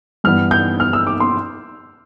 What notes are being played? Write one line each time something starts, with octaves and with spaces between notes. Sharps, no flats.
G2 E3 B3 F6
G6
F6
E6
D6
C6